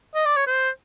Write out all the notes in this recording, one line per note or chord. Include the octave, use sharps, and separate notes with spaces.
D#5
D5
C#5
C5